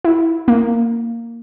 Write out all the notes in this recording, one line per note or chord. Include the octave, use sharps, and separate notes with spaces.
E4
A#3